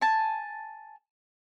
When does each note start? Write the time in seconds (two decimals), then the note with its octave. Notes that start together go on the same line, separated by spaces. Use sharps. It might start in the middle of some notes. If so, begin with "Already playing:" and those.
0.01 G#5 A5